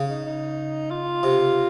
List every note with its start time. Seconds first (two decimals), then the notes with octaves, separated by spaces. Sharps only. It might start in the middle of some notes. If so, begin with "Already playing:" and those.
Already playing: C#3
0.09 D#4
0.25 D#4
0.91 F4
1.23 C3